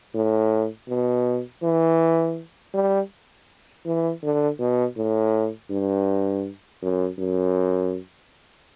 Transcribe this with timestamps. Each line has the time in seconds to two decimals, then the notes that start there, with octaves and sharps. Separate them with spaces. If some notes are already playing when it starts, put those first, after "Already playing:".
0.14 A2
0.89 B2
1.63 E3
2.74 G3
3.85 E3
4.23 D3
4.59 B2
4.97 A2
5.70 G2
6.82 F#2
7.19 F#2